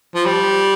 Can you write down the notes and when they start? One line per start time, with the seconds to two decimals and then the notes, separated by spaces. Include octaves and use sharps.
0.15 F3
0.26 G3